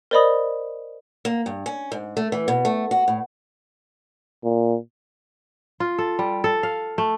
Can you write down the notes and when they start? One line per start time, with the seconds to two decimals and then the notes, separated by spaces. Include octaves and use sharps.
0.11 A#4 C5 D5 D#5 B5 D#6
1.25 A#3
1.46 G2
1.66 C#4
1.92 G#2
2.17 A3
2.32 E3
2.48 B2
2.65 A3
2.91 F#4
3.08 A2
4.44 A#2
5.80 F4
5.98 A4
6.19 G3
6.44 A4
6.63 F5
6.98 A3